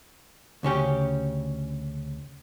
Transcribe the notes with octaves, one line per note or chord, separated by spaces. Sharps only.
D2 C#3 C#4 G4